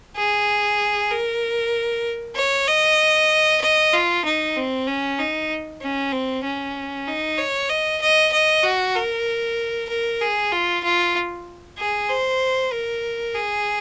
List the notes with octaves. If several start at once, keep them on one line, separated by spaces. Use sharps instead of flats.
G#4
A#4
C#5
D#5
D#5
F4
D#4
C4
C#4
D#4
C#4
C4
C#4
D#4
C#5
D#5
D#5
D#5
F#4
A#4
A#4
G#4
F4
F4
G#4
C5
A#4
G#4